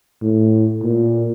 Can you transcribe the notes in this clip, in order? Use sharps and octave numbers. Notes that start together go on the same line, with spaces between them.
A2
A#2